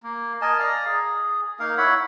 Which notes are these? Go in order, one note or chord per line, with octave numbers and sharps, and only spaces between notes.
A#3
A#4 D#5 G#5 A5
D5 F5 A#5
G#4
A#3 D#4 A#4 F5
E4 C#5 F#5 B5